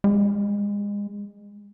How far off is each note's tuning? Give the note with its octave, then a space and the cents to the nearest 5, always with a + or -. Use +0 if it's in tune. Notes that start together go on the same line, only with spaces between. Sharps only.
G#3 -30